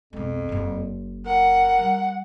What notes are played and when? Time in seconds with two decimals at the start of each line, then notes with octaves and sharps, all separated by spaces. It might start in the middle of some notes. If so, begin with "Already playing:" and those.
0.13 B1 F2 G#3
0.49 F#1 F4
1.26 A#4 F#5
1.78 G3